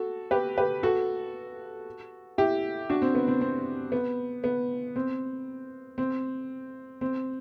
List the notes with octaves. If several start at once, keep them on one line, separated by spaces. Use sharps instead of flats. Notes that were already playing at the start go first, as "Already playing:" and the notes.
Already playing: F#4 A4
G4 B4
G4 B4
F#4 A4
E4 G4
D4 F#4
C4
B3
C4
C4
B3
B3
C4
C4
C4